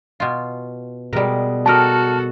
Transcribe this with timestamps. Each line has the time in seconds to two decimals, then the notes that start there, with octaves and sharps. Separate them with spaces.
0.20 B2 F4
1.13 B2 G3 G#3 A#4
1.66 F#4 G4 A4 A#4 D#5 A5 F6